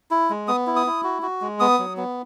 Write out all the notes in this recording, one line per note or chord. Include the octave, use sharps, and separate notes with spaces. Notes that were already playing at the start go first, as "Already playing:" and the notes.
E4
G#3
B3 D#6
E4
D#6
E4
F#4
F#4
G#3
B3 D#6
F#3
B3